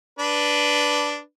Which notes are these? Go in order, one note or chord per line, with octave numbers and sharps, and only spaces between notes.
D4 B4